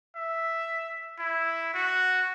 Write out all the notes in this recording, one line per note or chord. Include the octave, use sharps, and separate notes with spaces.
E5
E4
F#4